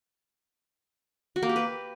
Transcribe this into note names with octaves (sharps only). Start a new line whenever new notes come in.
F#4
A#3
G4
B4